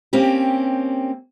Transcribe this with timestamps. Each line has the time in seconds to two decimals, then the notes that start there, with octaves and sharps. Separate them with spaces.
0.13 A#3 C4 C#4 G4